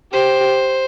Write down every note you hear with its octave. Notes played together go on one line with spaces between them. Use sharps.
G4 C5